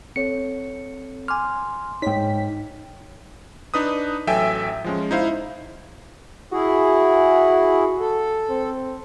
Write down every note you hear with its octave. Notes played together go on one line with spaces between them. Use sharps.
C4 A4 C#5 C#7
G#5 C6 D6 F6 F#6
G#2 D#4 C#5 G5 B6
D4 D#4 B4 D#6
A1 F#3 A4 E5 G5 G#5
F3 G#3 C#4
D#4 E4 C5 F5
E4 F#4 G#4
A4
C4